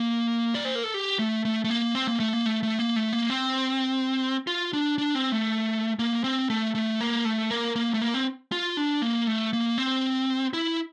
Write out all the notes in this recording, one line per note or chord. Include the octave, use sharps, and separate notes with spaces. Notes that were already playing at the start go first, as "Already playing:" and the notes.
Already playing: A#3
D5
C5
A#4
A4
G4
A3
A3
A3
A#3
C4
A#3
A3
A#3
A3
A3
A#3
A3
A#3
C4
F4
D4
D4
C4
A3
A#3
C4
A3
A3
A#3
A3
A#3
A#3
A3
A#3
C4
F4
D4
A#3
A3
A#3
C4
E4